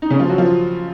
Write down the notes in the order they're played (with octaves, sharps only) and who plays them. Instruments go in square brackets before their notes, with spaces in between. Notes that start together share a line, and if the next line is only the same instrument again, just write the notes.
[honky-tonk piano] D#4
C#3 C#4
F3 F4
F#3 F#4
F3 F4